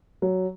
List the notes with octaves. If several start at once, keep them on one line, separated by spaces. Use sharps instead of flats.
F#3